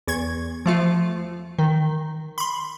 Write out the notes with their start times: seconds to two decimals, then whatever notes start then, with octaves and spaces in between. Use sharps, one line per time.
0.08 E2 C#6 G#6
0.66 F3 A3 F4
1.59 D#3
2.38 B5 C6